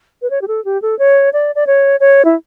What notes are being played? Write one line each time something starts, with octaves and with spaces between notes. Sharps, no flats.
B4
C#5
G4
A4
G4
A4
C#5
D5
D5
C#5
C#5
E4